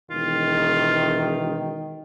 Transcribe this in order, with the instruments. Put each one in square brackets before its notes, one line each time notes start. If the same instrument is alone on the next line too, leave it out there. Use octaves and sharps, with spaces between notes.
[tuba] E1 [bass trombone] D#3 [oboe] F4